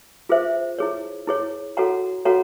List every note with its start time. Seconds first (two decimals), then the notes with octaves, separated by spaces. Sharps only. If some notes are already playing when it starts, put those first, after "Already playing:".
0.29 F4 G#4 C5 E5
0.79 E4 G#4 C#5
1.27 E4 G#4 C#5
1.77 F#4 A4 C#5 F#5 A#5
2.25 F#4 A4 C#5 F#5 A#5